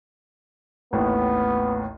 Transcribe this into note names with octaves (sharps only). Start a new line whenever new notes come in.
A1 D#2 A2 B3